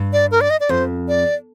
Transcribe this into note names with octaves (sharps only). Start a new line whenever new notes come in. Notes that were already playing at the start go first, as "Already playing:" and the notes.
Already playing: G2
D5
A#4
D5
D#5
D5
F2 C5
D5